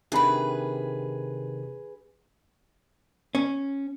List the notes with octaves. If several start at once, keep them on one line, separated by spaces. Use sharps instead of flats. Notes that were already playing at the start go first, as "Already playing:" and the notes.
C3 D#3 D4 G#4 B4 B5
C#4